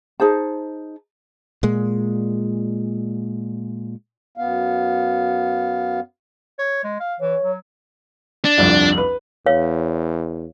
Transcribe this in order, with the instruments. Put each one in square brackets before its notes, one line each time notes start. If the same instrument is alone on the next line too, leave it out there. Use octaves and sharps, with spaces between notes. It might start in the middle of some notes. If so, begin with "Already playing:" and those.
[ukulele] D#4 G#4 C5 A5
[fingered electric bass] A#2 G#3
[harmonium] F#2 B3 F5
[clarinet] C#5
G#3
F5
[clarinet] E3 [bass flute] C#5
[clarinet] F#3
[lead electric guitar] D4
[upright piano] G1 C2 F2
B4
[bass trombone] E2 [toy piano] C#5 F5